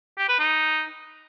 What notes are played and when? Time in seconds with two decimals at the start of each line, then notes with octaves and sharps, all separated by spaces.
0.18 G4
0.29 B4
0.39 D#4